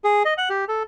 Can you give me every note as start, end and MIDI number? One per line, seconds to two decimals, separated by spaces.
0.04 0.23 68
0.25 0.34 75
0.38 0.49 78
0.50 0.65 67
0.69 0.83 69